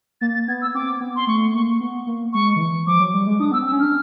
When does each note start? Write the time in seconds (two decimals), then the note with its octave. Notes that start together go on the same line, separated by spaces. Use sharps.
0.21 A#3 A6
0.34 A6
0.48 B3 G#6
0.62 E6
0.75 C4 D6
1.01 B3
1.16 C6
1.27 A3 C#6
1.54 A#3 C#6
1.81 B3
2.07 A#3
2.33 G#3 C#6
2.56 D#3
2.60 E3
2.87 F3 D6
3.00 F#3
3.14 G3
3.27 G#3
3.40 D4 D#6
3.52 B3 E6
3.62 C4 E6
3.72 C#4
3.80 D4 F6